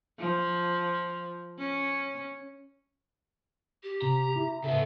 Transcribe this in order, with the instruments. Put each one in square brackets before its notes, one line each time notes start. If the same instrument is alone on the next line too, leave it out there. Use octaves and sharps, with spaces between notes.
[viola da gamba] F3
C#4
[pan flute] G4
[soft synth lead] C3 [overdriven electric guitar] A#5
[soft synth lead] E4
[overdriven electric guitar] C#3 B3 [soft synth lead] A4 [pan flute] E5